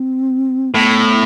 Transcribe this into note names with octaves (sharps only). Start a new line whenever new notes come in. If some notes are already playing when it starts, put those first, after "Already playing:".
Already playing: C4
A2 B3